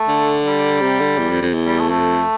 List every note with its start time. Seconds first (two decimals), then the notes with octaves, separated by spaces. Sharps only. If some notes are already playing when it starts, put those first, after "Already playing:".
Already playing: A3
0.08 D3
0.46 G3
0.81 C3
1.00 D3
1.18 E2
1.30 F2
1.42 F2
1.54 E2
1.65 G3
1.79 A3
1.89 F2 A3